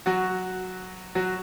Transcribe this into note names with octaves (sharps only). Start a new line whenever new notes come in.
F#3 F#4
F#3 F#4